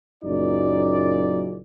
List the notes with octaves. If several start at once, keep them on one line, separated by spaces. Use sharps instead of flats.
F#1 F#2 A#2 D#4 D5